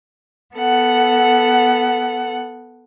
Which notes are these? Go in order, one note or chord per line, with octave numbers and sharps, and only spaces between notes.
B3 A4 F#5